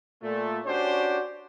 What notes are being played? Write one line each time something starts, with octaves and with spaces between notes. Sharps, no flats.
A#2 A3
C#4 D4 F#4 G4 C5